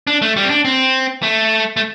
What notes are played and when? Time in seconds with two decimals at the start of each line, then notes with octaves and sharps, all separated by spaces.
0.07 D4
0.22 A3
0.36 G3
0.44 C4
0.50 D4
0.65 C4
1.23 A3
1.77 A3